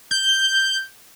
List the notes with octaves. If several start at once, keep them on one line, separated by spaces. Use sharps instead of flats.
G6